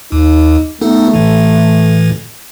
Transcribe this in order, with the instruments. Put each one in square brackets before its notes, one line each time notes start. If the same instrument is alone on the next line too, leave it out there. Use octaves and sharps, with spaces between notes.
[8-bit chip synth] D#2 [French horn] D#4
[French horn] A3 [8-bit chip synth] B3 D#4 A4
[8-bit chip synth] A2 E3